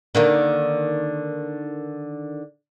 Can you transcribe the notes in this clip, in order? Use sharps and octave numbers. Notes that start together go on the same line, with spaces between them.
D3 D#3 A#3